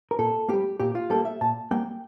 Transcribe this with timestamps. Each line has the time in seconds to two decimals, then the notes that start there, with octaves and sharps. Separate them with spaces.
0.11 A#4
0.19 A#2 A4
0.49 G3 A#3 G4
0.80 A#2 G4
0.95 F4
1.10 G3 A#3 A4
1.25 E5
1.41 A#2 A5
1.71 G3 A#3 G5